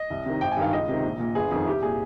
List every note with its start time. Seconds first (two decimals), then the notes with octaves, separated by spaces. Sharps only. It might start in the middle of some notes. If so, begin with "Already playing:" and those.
Already playing: D#5
0.10 C2
0.25 C3 D#3
0.41 G#1 G5
0.52 G#5
0.57 G2 D#3 F5
0.72 C#2 D#5
0.88 C3 D#3
1.03 A#1
1.19 A#2
1.35 G1 G#4
1.51 F2 D#3
1.66 C2 G4
1.82 A#2 G#4